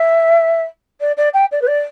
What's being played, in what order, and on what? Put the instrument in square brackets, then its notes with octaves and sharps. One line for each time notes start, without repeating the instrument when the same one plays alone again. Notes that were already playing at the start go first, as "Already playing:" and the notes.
Already playing: [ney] E5
D5
D5
G5
D5
B4
D5